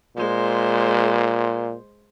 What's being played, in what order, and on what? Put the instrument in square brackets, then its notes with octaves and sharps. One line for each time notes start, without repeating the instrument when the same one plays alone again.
[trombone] A#2 [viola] G#3 C5